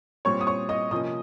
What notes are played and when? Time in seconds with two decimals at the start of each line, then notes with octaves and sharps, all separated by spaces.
0.25 A#2 G3 C4 C#5 C#6
0.41 D#6
0.47 C#5 C#6
0.69 D#5 D#6
0.91 C3 F3 A#3 C#4 D#5 D#6